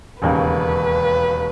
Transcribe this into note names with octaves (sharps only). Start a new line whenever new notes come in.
E1 D#2 C#3 B4